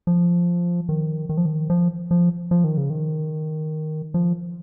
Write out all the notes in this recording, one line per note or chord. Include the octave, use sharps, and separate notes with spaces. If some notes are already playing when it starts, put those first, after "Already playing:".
F3
D#3
D#3
F3
D#3
F3
F3
F3
D#3
C#3
D#3
F3